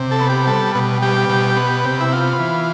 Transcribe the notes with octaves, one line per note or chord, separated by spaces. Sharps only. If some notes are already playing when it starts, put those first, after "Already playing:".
Already playing: C3
A4
B3
G4
G3 A4
B2
G3 G4
B2
B3
C3
E4
B3 F4
E3